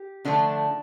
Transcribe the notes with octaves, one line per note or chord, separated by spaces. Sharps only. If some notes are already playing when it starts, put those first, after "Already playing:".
Already playing: G4
D3 F3 A3 D4